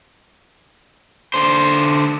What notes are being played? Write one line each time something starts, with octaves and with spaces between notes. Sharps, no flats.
D3 C5